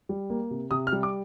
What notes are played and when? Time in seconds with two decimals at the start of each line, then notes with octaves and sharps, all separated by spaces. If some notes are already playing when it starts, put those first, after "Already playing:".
0.09 G3
0.30 A#3
0.51 C3
0.71 C3 D#6
0.87 F6
0.92 G3
1.03 D6